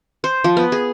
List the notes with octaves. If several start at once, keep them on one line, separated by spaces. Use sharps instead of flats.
C5
F3
B3
G#4